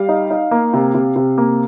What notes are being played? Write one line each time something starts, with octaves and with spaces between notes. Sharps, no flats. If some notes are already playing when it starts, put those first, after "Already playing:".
Already playing: G3 F5
D#4
D#4
A#3
C3
C3
C3
A#3